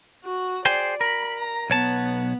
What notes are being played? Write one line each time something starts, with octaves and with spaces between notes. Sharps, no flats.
F#4
G#4 C5 D5 G5
A#4 B5
A#5
B1 B3 C#5 A5